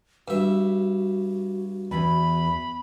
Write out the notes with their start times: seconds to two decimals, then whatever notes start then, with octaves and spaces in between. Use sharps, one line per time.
0.28 G2 F#4 E5
1.91 E2 B5